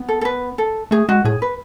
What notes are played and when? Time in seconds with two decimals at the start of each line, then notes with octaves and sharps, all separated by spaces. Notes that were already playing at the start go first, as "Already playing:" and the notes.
Already playing: B3
0.08 A4
0.21 A4
0.25 B4
0.58 A4
0.91 A3 G#4
1.09 G#3 F#4
1.24 A2 G#4
1.42 B4